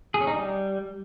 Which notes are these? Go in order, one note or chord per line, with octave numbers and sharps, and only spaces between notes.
G#4
C#4
D#4
G3